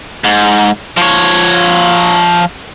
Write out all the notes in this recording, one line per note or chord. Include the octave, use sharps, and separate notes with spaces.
G#2
F3 C#5